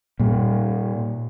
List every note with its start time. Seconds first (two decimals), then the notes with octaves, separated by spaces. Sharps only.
0.20 A#2 G3